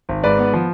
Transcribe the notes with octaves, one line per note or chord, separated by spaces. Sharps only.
G#1
G#2 B4 D5
B3
F3